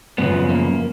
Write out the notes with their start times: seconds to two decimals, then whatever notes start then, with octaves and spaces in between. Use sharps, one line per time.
0.18 F#2 C#3 F3 B3
0.49 A#3